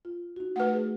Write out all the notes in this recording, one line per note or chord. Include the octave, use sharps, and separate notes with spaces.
F4
D#4 F#4
A3 B4 F#5
G#4